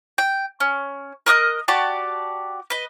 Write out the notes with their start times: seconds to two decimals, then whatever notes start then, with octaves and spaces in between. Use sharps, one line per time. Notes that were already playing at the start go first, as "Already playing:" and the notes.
0.18 G5
0.60 C#4
1.26 A#4 D#5 D#6 F#6
1.68 F#4 G4 D5 A5
2.70 B4 D#5